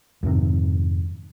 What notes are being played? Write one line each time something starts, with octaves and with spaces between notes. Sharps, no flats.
F2 G#2 C3 D#3